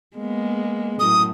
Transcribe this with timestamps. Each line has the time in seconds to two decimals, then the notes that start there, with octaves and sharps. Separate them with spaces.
0.17 G#3 A#3 B3
1.00 F#2 A2 D#6